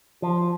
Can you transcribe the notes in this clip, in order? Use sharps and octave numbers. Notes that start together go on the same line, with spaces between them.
F3